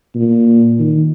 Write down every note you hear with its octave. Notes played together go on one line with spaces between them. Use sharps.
A#2
D#3